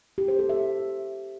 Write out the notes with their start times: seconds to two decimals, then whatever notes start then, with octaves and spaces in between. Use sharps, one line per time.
0.18 G4
0.28 C5
0.39 A4
0.49 E5